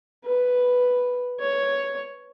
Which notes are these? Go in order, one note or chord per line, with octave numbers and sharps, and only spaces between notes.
B4
C#5